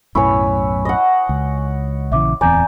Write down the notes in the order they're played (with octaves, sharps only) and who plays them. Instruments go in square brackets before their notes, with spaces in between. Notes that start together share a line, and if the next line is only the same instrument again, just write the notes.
[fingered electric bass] B1 F#2 A2 [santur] E4 B4 C#5 [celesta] G#5 C#6
[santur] D#5 F#5
[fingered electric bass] C#2
[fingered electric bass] A#1 C#3 E3 [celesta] E5 D6
[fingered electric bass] D1 E2 C4 [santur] D5 [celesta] G#5 A#5 G6